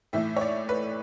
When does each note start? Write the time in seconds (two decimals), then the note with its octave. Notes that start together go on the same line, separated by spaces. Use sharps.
0.13 A2 E3 A3 E5
0.36 C#5
0.41 D5
0.69 B4